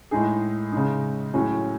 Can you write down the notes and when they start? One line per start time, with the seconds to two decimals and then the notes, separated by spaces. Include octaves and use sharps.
0.11 A2 G#3 D#4 G#4
0.72 C#3 G#3 D#4
1.34 A2 F#3 C#4 G#4